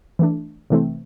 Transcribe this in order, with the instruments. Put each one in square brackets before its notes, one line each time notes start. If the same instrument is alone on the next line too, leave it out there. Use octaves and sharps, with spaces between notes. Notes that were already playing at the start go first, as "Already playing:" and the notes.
[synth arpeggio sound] E3 A3 D4
C3 E3 A3 C4